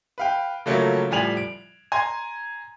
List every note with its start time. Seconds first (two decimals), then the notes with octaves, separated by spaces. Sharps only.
0.18 B4 F5 G5
0.66 C#3 F3 F#3 A3 A#3 C#4
1.11 A2 F3 G3 G#5 F7 F#7
1.37 D7
1.92 G#5 A#5 C6 G#6